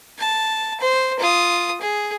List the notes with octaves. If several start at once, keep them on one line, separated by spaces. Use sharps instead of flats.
A5
C5
F4 D#6
G#4